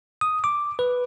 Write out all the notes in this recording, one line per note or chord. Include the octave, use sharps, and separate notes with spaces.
D#6
D6
B4